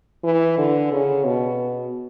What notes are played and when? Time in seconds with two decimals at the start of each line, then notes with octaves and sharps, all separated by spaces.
0.24 E3
0.58 D3
0.92 C#3
1.25 B2